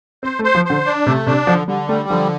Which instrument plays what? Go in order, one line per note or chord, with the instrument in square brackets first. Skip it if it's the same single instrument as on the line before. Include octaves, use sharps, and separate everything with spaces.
[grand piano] C4 [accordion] C5
[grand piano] A3
[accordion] C5
[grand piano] F3
[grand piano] D3 [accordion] C5
[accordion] D4
[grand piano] C3 [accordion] A3
[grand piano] C3 [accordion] D4
[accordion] D3 [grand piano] F3
[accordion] D3 [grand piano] G3
[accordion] G3 [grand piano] A3
[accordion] D3 [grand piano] F3